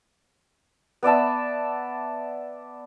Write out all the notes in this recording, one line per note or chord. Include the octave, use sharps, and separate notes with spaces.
B3 D5 E5 A5